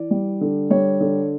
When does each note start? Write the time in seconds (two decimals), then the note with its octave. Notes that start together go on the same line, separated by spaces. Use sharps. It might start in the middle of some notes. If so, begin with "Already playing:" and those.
Already playing: E3 D5
0.11 G3
0.41 D3
0.70 G3 C#5
1.00 D3